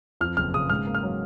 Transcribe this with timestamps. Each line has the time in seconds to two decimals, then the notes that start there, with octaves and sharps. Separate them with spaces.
0.21 F2 F6
0.37 F#1 F6
0.54 C#3 D#6
0.70 G#2 F6
0.87 A#3
0.95 F6
1.03 F#3